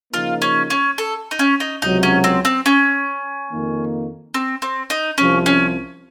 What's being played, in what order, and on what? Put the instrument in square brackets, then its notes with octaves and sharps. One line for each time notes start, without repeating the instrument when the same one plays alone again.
[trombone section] C#3 F3 A#3 D#4 [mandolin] F4
[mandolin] C#4
C#4
A4
D#4
C#4
D#4
[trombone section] C#2 C3 F#3 [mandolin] D#4
[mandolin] C#4
C4
C4
C#4
[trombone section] F2 D#3 A#3
[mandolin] C4
C4
D#4
[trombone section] C2 C3 F3 [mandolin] C#4
[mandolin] C#4